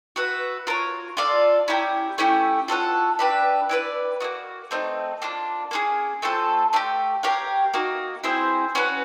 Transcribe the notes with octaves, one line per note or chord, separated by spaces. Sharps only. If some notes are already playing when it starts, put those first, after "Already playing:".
F#4 B4 E5
F4 A#4 C#5
F4 A4 D5 F5
C#4 E4 G4 A#4
A3 C#4 E4 G4
F4 A4 C#5 F#5
D4 G4 B4 E5
E4 G4 B4 D5
A#3 D#4 F#4
A3 C4 D#4
A#3 D4 F4
A#3 C#4 F4 G#4
A3 C4 F4 A4
A3 D4 G4
G4 A#4 C#5 F5
A#3 D#4 F#4
C4 E4 G#4 C5
C#4 F#4 B4